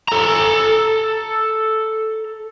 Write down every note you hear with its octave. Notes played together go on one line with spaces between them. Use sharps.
A4 A#5